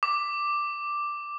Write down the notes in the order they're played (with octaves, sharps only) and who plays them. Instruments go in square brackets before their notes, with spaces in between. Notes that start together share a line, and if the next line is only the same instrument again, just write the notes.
[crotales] D6